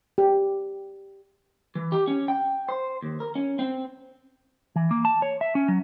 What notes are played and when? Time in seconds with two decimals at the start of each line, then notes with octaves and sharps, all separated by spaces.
0.18 G4
1.75 E3
1.92 G4
2.07 C#4
2.28 G5
2.69 C5
3.02 D#2
3.20 A#4
3.35 C#4
3.59 C4
4.76 E3
4.91 A#3
5.05 A5
5.22 C#5
5.41 E5
5.55 C#4
5.68 F#3